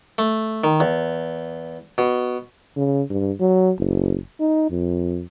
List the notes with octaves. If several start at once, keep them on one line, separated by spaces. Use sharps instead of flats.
A3
D#3
E2
B2
C#3
G2
F#3
F#1
D#4
F2